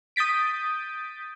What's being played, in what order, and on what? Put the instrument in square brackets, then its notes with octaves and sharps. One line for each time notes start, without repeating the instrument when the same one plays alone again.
[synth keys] D#6 G6 A6 B6 D7